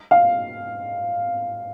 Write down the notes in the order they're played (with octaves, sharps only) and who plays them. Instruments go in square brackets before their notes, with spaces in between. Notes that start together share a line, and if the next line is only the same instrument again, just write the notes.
[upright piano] F5